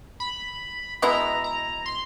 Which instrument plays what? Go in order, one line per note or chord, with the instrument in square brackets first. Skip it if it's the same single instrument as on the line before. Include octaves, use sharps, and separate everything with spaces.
[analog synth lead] B5
[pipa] B2 G#3 B3 E4 [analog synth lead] A#5
[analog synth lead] A#5
C6